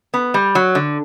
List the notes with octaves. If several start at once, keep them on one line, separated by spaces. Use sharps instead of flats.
B3
G3
F#3
D3